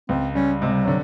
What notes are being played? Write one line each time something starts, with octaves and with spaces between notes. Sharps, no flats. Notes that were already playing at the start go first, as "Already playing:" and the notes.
C#2 C4
G3 C#4
C3 G#3
G3
D3 F#3